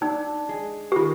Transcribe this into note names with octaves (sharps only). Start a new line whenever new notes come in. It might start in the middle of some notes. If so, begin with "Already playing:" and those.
D4 D#4
G#3
G4
D#3 F4